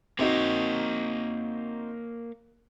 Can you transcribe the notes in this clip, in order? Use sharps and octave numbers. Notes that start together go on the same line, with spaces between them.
A#3 C4 D#4 F#4 C#5